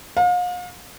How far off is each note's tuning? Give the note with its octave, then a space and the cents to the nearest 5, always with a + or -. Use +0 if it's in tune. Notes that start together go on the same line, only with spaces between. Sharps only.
F5 +40